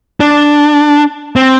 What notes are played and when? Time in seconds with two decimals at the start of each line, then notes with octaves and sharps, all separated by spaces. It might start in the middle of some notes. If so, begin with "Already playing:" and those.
0.20 D4
1.36 C4